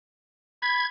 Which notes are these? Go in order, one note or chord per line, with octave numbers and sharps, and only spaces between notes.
B5 G#6